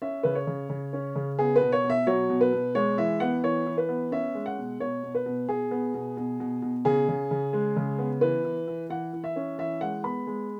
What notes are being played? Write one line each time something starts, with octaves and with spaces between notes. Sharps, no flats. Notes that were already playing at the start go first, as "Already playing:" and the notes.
C#4 E5
C#3 B4
C#5
C#3
C#3
C#4
C#3
B3 G#4
B4
B2
C#5
B2
E5
F#3 C#5
B2
B4
B2
G#3 C#5
E3 E5
B3 F#5
E3 C#5
E3
B4
B3
C#4 E5
G#3
F#5
B2
B2 C#5
B2
B4
B2
B2 G#4
B3
B2
B2
B2
B2
C#3 G#4
C#3
C#3
G#3
C#3
B3
E3 B4
E3
E3
E3 F#5
E3
E5
C#4
E3 E5
G#3 F#5
B3 B5
G#3